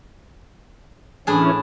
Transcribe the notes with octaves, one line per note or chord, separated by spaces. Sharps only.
A2 E3 C#4 D4 G#4